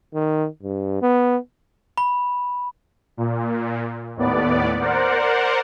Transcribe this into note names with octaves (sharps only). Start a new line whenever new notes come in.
D#3
G2
B3
B5
A#2
D#2 A2 B3 D5
A#4 C5 D5 F#5